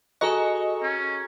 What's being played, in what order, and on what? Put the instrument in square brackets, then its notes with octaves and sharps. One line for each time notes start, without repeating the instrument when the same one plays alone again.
[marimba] F#4 [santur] G#4 A#5 C#6 [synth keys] A4 D#5
[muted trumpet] C#4